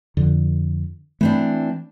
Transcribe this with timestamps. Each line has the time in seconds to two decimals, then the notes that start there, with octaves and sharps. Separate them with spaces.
0.17 F2 D3
1.21 E3 A3 C4 D4